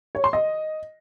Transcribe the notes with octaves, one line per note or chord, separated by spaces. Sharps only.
C#5
C6
D#5